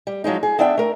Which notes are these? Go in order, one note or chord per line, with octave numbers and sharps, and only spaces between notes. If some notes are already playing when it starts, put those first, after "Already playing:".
G3
F3 F#3 G#3 D#4
G#4
B3 D4 D5 E5 F#5 G5
A3 A#4